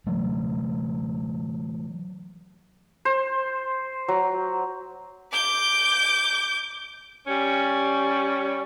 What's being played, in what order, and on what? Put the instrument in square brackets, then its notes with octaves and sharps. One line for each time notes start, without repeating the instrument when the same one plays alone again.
[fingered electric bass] E3 F#3 A3
[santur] C5
F#3
[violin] D6 G6
[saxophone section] G3 C#4